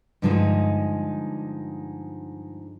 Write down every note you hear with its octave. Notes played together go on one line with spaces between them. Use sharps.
G2 D3 F3 G#3 C#4 D#4